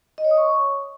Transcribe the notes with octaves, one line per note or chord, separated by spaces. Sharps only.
D#5
C#5
D#6
C#6